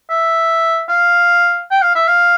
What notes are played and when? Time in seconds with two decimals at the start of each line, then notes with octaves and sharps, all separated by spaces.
0.09 E5
0.89 F5
1.71 G5
1.82 F5
1.95 E5
2.08 F5